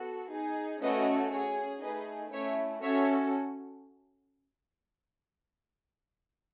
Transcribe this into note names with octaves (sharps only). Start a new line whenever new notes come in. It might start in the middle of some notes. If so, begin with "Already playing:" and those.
Already playing: B3 F#4 A4
D#4 G#4
A3 C#4 F#4 A4 B4 D#5
C#4 G#4 C#5
A3 D#4 G#4 B4 D#5
A3 C#4 E4 C#5 E5
C#4 F#4 A4 C#5 E5